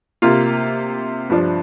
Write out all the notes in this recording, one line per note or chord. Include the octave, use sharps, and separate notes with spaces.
C3 A#3 F4
G2 F3 D4